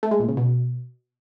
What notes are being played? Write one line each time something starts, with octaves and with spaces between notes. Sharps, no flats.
A3
G#3
A#2
C#3
B2